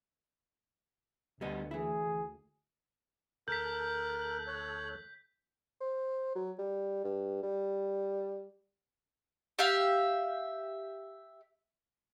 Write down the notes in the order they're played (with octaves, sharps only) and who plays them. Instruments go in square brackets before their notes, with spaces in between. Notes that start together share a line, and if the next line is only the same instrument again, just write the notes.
[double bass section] D2 [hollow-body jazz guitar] G3 B3 D#5
[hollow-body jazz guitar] E3 E4 [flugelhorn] G#4
[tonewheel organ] D2 A4 F#6 [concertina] A#4 [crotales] G6 B6
[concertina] C#5
[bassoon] C5
F#3
G3
G2
G3
[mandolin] G4 E5 F5